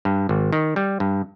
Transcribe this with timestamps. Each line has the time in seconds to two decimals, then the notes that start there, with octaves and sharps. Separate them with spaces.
0.05 G2
0.29 G#1
0.53 D#3
0.76 G3
1.00 G2